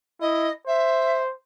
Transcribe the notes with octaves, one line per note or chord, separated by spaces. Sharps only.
E4 D#5
C5 E5